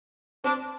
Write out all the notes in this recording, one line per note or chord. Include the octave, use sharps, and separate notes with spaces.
C4 D4